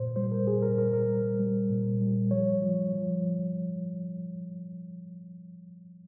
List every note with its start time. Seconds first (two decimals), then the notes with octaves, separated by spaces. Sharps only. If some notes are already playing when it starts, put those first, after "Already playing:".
Already playing: A#2 C5
0.16 G3 C5
0.32 A#4
0.47 A#2 G#4
0.62 A#4
0.78 G3 A#4
0.93 A#4
1.08 G3
1.40 G3
1.70 A#2
2.01 G3
2.31 F3 C#5
2.62 F3
2.93 F3